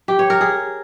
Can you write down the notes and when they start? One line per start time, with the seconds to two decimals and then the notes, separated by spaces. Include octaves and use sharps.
0.08 G4
0.19 C#5
0.30 A#4
0.41 G#4